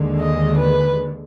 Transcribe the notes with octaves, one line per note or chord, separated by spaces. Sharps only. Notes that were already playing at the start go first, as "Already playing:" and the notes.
Already playing: D#2 D3 G#3
D#5
B4